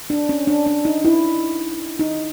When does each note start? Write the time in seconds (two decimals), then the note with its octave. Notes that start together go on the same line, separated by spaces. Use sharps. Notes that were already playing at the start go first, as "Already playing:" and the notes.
0.10 D4
0.29 C#4
0.47 D4
0.66 D4
0.85 D#4
1.05 E4
1.99 D#4